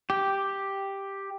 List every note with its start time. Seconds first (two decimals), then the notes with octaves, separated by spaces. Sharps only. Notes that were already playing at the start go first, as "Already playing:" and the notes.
0.10 G4